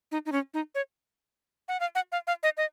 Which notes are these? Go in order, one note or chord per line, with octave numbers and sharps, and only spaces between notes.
D#4
D#4
C#4
D#4
C#5
F#5
F5
F#5
F5
F5
D#5
D#5